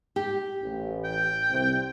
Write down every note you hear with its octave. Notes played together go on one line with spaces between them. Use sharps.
G4
A1
G5
C2 C3